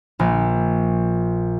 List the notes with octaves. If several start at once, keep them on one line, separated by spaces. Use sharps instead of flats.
A#1